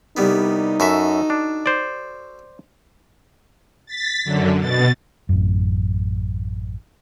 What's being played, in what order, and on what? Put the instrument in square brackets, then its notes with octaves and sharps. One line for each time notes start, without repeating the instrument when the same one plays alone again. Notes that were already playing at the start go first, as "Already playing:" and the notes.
[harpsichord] C2 G3 B3 [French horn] D#4
[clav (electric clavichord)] F#2 E5 [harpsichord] F#4 A4
[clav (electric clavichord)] D4
C5 D5
[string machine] A6 B6
F#2 D3
B2 A6
[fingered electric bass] A1 F#2